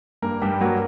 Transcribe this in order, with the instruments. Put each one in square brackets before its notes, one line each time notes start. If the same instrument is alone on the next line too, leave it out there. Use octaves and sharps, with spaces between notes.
[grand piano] G2 A#3 A#4
G2 G3 G4
F#3 A#3 F#4